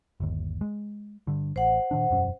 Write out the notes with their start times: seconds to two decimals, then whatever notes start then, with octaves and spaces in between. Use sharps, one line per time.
0.20 G1 D#2
0.61 G#3
1.27 G2 D3
1.56 A1 C5 F#5
1.91 A#2 D#3 D4
2.10 E1 F#2 C#4